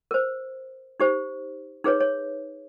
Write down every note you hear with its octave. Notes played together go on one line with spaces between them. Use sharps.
A#4 C5
D#4 G4 C5
D#4 G#4 B4 C#5
C#5